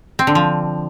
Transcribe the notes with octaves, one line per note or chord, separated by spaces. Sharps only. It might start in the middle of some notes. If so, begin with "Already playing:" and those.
C4
D3
F3